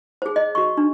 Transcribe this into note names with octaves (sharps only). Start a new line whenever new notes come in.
G#4 C5
D#5
F#4 C#6
D4